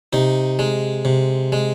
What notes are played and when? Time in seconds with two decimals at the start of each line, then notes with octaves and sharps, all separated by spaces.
0.13 C3 D#4
0.59 G#3
1.05 C3
1.52 G#3